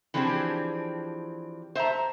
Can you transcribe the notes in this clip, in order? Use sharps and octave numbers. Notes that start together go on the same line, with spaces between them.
E3 F3 C4 D4 G4 G#4
C5 E5 A5 A#5